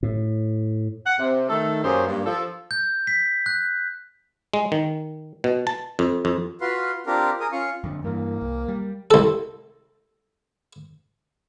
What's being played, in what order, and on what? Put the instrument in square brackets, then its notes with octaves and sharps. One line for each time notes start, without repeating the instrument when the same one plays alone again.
[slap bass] A2
[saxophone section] F#5
C3
D#3 A3 A4
F#2 A#3 C#4 G4 G#4 C5
G2 A#3
F3 A4
[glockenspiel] G6
B6
F#6
[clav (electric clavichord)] G#3
D#3
B2
A5
F2
F2
[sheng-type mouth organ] F4 F#4 B4 F5 C6
C4 D4 F4 G4 A#4
G#4 A#4 D#6
C#4 F4 F5 C#6
[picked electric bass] F2 D3
[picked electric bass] G2 E3 [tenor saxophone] A#3
[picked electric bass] C2
G3
[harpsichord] C2 A4